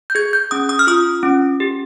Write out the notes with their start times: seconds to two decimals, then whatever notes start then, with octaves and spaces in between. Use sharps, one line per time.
0.10 G6
0.15 G#4 G#6
0.33 G6
0.51 C#4 D#6
0.69 D#6
0.79 F6
0.87 F4 D#6
1.23 C#4
1.60 G4